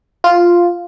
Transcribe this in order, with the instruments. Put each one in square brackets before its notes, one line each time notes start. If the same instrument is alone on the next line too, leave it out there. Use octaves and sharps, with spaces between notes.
[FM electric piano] F4